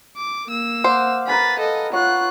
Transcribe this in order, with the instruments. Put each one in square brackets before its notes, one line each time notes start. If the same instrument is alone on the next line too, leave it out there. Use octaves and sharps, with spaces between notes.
[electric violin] D6
A#3 E6
[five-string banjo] C5 [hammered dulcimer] F5 F#5 D6
[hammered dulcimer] A#4 B4 G#5 [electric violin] B5 A6
[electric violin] A4 D#5
[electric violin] F4 F#6 [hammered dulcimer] C#5 F#5